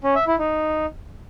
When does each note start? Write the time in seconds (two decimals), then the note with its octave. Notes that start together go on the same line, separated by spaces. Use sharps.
0.04 C#4
0.15 E5
0.27 E4
0.39 D#4